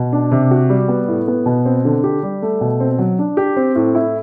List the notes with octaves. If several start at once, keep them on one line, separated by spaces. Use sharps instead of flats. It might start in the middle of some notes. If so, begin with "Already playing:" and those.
Already playing: B2
D4
C3
F#4
G3
B3
A2
B3
B2
C4
D3
G4
G3
A3
B2
C4
F#3
D4
G4
C4
A2
E4